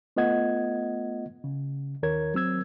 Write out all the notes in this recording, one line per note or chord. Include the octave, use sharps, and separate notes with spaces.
A3 B3 F4 D#5 F#5 G#6
C#3
D#2 D#3 A#4 C#5 G#6
F#3 C4 E6 G#6